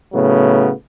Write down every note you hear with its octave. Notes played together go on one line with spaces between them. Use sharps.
A2 C#3 F#3 B3